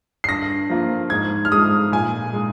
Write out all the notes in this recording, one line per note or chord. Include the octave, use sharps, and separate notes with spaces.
C7
G2 A#6
F3 A#3 F4
G#2 G#6
F6
F3 G#3 D#6
A#2 G#5
G#3 D#4